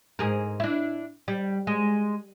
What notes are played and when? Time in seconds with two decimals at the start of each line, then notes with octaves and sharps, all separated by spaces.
0.19 G#2 G#4 A#4
0.60 D4 E4
1.28 G3
1.67 G#3